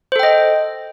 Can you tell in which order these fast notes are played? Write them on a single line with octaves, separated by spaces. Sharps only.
C5 A4 G5 D#5